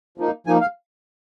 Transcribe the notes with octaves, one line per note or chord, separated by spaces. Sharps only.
F3 A#3 D#4
F3 A#3 D#4 G#5
F5